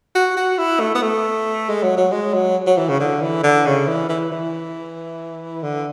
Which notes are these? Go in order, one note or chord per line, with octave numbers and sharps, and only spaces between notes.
F#4
F#4
E4
A3
B3
A3
G#3
F#3
F#3
G#3
F#3
F#3
E3
C#3
D3
E3
D3
C#3
E3
E3
E3
D3